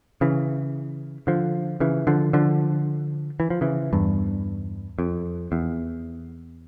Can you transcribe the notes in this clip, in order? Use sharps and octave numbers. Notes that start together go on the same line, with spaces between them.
C#3 E3
D3 F3
C#3 E3
D3 F3
D3 F3
E3
F3
C#3 E3
E2 G2
F2
E2